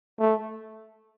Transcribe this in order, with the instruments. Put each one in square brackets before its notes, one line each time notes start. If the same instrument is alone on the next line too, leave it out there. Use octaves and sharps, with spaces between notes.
[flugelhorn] A3